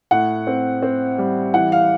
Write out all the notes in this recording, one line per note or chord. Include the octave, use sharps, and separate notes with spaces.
A2 F#5
C4
C4
G3
E3 F#5
F5